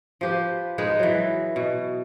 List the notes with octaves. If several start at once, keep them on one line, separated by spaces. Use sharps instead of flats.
F3 G4 B4
G#3 D#4 G#4 B4
E3 F#3
B2